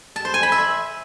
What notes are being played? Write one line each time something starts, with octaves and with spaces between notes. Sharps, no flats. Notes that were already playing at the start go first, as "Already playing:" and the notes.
A5
C5
G#5
B5
E5